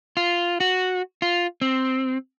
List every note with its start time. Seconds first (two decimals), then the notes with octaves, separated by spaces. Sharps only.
0.17 F4
0.60 F#4
1.22 F4
1.61 C4